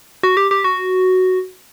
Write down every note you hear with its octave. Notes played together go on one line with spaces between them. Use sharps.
F#4
G4
G4
F#4